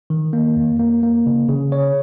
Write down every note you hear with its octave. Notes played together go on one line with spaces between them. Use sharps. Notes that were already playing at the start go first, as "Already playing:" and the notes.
D#3
A#3
F2
A#3
A#3
C#3
C#3
C#5